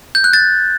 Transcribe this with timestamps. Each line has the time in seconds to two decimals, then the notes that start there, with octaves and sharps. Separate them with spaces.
0.15 G6
0.24 F#6
0.33 A6